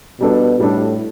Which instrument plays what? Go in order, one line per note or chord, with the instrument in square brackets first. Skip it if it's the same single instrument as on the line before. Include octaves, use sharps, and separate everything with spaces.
[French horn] B2 [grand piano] G3 D4 A4
[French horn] A2 [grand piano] G3 D4 A4